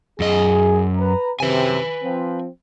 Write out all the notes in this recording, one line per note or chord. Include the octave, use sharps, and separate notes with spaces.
F#2 G#4 D#5
B4 A#5
F#2 C3 B4 G#5
F3 C4